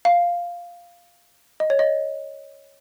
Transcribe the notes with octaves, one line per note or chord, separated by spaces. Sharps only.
F5
D#5
C#5
D#5